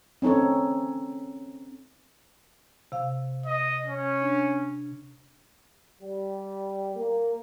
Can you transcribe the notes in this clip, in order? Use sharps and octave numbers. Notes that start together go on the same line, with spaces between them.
C4 C#4 D#4 A4 C#5
C3 F5
D#5
C#4
D4
G3
A#3